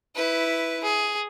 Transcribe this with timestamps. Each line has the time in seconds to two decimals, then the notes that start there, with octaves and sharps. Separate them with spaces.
0.16 E4 B4
0.83 G#4